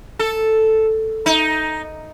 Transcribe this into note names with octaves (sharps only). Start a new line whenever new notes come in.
A4
D#4